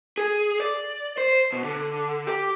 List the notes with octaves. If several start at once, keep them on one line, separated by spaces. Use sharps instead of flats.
G#4
D5
C5
B2
D3
G4